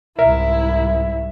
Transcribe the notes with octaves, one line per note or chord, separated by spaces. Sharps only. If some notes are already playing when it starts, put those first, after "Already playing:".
C2 G#2 E4 A#4 E5